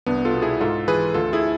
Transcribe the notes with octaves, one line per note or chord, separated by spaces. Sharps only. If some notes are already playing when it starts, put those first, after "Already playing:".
C2 B3 D4
F4 A4
B2
E4 G#4
G#2 F4 A4
E3 G#4 B4
D2 F4 A4
E4 G#4